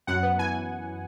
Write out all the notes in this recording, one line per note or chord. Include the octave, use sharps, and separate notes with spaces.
F#2 F#5
B3
E3 G#5